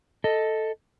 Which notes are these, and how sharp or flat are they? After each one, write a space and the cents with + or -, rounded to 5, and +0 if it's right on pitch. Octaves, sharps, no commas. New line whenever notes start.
A4 +0 D#5 +10